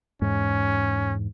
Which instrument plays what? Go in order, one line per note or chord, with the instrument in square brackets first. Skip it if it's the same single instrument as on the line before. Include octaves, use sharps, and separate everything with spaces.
[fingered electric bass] E2 G#2 [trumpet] C#4